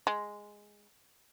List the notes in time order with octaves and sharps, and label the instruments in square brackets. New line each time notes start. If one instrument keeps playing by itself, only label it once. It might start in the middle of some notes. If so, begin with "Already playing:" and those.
[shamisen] G#3